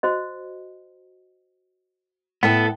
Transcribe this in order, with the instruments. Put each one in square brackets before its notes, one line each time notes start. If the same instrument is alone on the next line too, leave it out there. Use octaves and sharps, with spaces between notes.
[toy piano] F#4 C5 D#5
[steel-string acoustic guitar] A2 A4 E5 [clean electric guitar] B3 [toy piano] G5